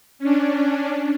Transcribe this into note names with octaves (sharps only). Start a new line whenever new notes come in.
C#4 D4